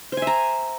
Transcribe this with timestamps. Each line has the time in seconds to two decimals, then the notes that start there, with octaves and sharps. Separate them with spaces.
0.12 C5
0.17 G#5
0.22 E5
0.27 A#5